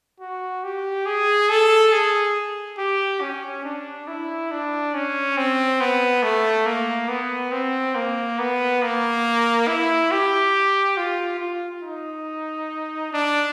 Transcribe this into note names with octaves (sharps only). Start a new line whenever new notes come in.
F#4
G4
G#4
A4
G#4
G4
C#4
D4
E4
D4
C#4
C4
B3
A3
A#3
B3
C4
A#3
B3
A#3
E4
G4
F4
F4
D#4
D4